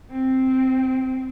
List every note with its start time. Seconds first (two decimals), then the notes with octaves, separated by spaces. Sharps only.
0.11 C4